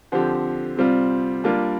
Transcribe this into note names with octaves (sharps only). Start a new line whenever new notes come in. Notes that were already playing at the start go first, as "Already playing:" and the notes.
D3 F3 C4 G4
C3 G3 C4 F4
G3 A#3 D4 F4